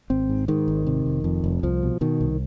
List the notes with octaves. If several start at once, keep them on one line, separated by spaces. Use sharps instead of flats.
G#1 C4
G#2
G#2 D#3
G#1
C3
F1
F2
F1
C2 F3
B2
B2 D#3
C2